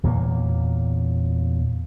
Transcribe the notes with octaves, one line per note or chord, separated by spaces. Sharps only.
E2 A#2 F#3 A#3